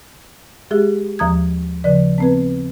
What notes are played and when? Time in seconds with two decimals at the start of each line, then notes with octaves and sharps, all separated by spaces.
0.71 G#3 G4 G#4 E5
1.19 D#2 F3 A#5 D#6 G#6
1.84 C#3 F3 D5
2.18 B3 C4 B4